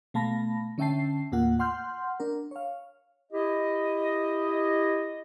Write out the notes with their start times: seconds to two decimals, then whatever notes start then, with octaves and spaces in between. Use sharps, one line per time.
0.14 B2 A3 F5 A5 B5 A#6
0.78 D3 C#4 E5 G5 A5 C7
1.32 D#2 A2 A#3 F4 F#5
1.59 F#5 C6 F6 G6
2.20 D4 A#4
2.51 C#5 F5
3.32 E4 G4 D#5